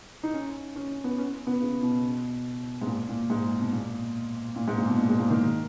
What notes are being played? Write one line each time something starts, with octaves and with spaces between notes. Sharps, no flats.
D#4
C#4
C#4
B3
C#4
B3
C#3
B2
G#2
A#2
A#2
G#2
B2
A#2
A#2
G#2
A#2
B2
A#2
G#2
A#2
D#3